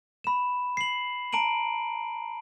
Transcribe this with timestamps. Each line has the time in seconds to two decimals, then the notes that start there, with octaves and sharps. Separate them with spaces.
0.24 B5 E7
0.77 C7 F#7
1.33 A5 A#5 D7 D#7 F#7